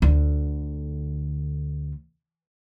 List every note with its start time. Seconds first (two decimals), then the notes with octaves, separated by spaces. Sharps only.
0.02 D2 D3